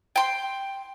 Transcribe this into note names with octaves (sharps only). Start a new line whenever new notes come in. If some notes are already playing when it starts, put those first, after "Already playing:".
G5 C6